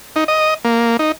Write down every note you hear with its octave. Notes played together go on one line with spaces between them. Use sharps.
D#4
D#5
A#3
D#4